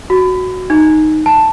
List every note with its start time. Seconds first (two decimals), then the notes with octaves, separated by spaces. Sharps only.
0.10 F#4
0.70 D#4
1.26 A5